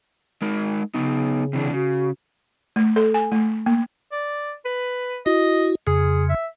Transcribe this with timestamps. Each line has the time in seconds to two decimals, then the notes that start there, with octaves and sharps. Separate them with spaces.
0.42 G#3 D#4 A#4
0.94 C#3 B3 D#4
1.53 C3 E3 D4
1.73 C#3 F#4
2.76 A3
2.96 A4
3.14 G#5
3.32 A3
3.66 A#3
4.12 D5
4.65 B4
5.26 E4 F#4 D#5
5.87 F2 C#3 G#4
6.29 E5